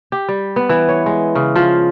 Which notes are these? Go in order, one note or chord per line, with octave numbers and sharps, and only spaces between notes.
G4
G3
B3
E3
C#5
G#3
C#3
F3